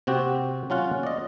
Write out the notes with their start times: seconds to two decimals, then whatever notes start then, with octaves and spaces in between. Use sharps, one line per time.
0.07 C3 C4 F#4 G4
0.70 F#3 C#4 F4 F#5
1.03 D5 D#5